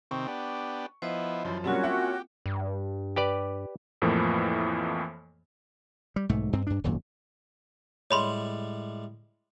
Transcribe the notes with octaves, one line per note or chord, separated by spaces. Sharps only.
C3 D#3 C4 C#6
B3 D4 G4
F3 B3 E4 C5 D#5
F#2 E3 F3 C5
B2 F#3 G3 A#3 C4 C#4 F4 F#4
A#3 G4 E5 F#5
G2
G4 B4 D5
F2 A2 E3 F3 A#3
G3
B1 G#2 A3
G2 C4
G2 D4
D#1 G#1 F#2 A#2
A2 G3 G#3 C#5 B5 C6